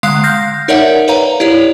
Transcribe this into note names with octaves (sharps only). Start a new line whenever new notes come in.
D3 G#3 F5 D#6 F#6 C7
F6 G6 A#6 C7
D#4 A#4 C#5 D5 E5 F#5
B4 C#5 F5 A#5
E4 G4 C#5 D5